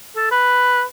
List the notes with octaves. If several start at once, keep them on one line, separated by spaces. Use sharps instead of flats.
A4
B4